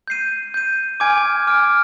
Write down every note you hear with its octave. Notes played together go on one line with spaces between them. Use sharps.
G6 C7 D#7
G6 C7 D#7
G#5 D6 F6 G#6 D7
G#5 D6 F6 G#6 D7